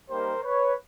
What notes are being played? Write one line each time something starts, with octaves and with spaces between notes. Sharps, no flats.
G3 A#3 D#4 G4 A#4 C5
B4 C#5